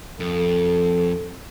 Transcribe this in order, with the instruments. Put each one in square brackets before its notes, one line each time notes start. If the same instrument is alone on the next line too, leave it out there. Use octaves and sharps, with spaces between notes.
[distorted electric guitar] F2 [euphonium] A4